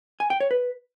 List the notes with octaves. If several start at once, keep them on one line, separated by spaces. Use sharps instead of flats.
G#5
G5
C#5
B4